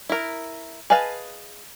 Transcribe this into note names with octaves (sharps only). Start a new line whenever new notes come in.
E4 A#4
G#4 B4 D#5 F5 A5